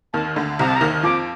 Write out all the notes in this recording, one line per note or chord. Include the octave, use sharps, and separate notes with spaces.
D#2 D#3 A5
D2 D3
C2 C3 A#5
A5
A#5
D#2 D#3
F2 F3 D6